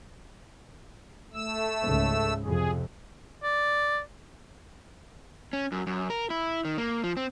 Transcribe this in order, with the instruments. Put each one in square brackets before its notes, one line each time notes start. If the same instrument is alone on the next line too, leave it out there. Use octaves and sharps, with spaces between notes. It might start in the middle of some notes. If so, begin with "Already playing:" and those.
[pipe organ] A3 E6
[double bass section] C#2 G#2 C#3
[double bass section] F2 C3 [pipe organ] G#4
[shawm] D5
[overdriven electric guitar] C#4
F#2
F#2
A#4
E4
D#3
A#3
F3
C4